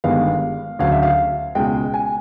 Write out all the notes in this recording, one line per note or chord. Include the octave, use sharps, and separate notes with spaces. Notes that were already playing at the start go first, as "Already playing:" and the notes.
G1 G2 D#3 G#3 B3 F5
D2 C#3 F#3 F5
E5
F5
C#2 B2 G#3 G5
G#5